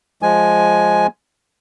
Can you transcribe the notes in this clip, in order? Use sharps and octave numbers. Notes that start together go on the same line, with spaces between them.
F3 G#3 G#5